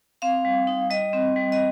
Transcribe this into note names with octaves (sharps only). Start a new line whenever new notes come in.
C4 F5
G3
D#4
G3 D#5
C4
G3
D#5